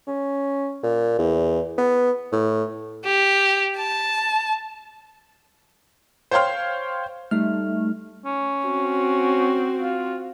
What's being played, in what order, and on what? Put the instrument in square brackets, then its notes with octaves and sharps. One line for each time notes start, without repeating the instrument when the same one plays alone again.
[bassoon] C#4
A#2
E2
B3
A2
[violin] G4
A5
[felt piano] C5 C#5 F5 G5 C6 F6
[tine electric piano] G3 D#4 F6 [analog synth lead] A3
[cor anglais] C#4
[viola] C4 F#4
[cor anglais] F4